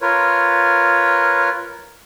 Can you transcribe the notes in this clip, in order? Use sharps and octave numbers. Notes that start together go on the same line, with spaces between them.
F4 A#4 B4 C#5